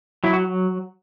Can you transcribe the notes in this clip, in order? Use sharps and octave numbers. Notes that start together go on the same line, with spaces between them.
F#3 E4
F#4